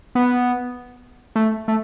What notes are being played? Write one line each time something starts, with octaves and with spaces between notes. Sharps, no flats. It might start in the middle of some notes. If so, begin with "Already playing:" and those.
B3
A3
A3